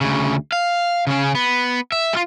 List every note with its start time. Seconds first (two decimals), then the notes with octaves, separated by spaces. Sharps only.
0.01 D2 C#3
0.52 F5
1.07 C#3 C#4
1.35 B3
1.92 E5
2.13 G3 F4